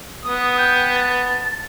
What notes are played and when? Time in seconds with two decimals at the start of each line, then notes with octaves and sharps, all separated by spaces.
0.24 B3 D#6
0.58 G5
0.95 A5